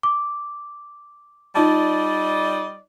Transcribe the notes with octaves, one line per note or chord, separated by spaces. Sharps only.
D6
G3 D#4 F4 D5 D#5 A5